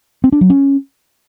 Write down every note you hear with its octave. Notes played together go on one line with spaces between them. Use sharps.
C4
D4
F#3
C#4